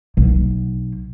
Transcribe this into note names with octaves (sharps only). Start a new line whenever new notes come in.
B1